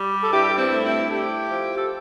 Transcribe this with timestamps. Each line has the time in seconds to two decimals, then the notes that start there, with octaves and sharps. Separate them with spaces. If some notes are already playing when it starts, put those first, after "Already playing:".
Already playing: G3
0.22 A4
0.32 G2 E4 G4
0.58 C4 E4
0.71 A3
0.84 C4 E4
1.09 A3 E4 G4
1.48 F3
1.76 A4